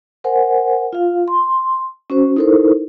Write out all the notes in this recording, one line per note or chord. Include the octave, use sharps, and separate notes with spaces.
A#4 C5 F#5 G#5
F4 F5
C6
C#4 F#4 C5
D#4 E4 A4 A#4 C5